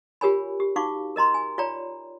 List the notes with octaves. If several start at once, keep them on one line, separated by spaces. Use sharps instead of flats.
F4 G4 A#4 C#5 G#5 B5
G4
D#4 F#4 F5 C#6 D6
A#4 D#5 A#5 C6
G#5
F4 C#5 D5 G5 A#5